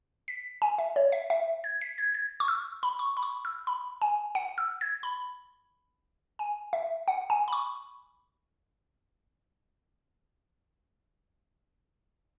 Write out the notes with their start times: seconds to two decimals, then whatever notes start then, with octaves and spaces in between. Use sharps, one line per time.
0.28 B6
0.62 G#5
0.78 E5
0.96 C#5
1.12 E5
1.30 E5
1.64 G#6
1.81 B6
1.98 G#6
2.14 G#6
2.40 C#6
2.48 E6
2.83 B5
2.99 C#6
3.17 B5
3.23 C#6
3.45 E6
3.67 B5
4.02 G#5
4.35 F#5
4.58 E6
4.81 G#6
5.03 B5
6.39 G#5
6.73 E5
7.08 F#5
7.30 G#5
7.48 B5
7.53 C#6